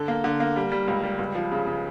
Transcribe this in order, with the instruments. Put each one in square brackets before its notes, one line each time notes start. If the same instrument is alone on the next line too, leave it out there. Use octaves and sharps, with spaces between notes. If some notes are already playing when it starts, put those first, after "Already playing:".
Already playing: [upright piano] D3 A4
A#3
D3
A#3
G3
G3
C#2
G3
C#2
F3
C#3
C#3